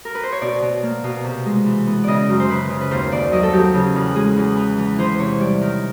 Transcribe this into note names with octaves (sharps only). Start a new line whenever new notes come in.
A#4
B4
C5
C#5
B2 D5
B2
A#3
B2
C3
G#3
E3
B3
C#3 D5 D#5
F#2
C5
C#3 B4
C#3
B4
D#2 C5
D#2 D5
F#3 D#5
A4
F#3 G4
G4
C#3
E2
G#3 G#4
E2
E3
E3
E3 C5
C3 C#5
G3 D5
D#3